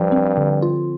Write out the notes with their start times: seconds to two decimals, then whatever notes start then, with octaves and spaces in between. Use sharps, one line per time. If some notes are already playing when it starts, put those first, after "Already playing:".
Already playing: G2 F3
0.12 C4
0.37 D3
0.62 F4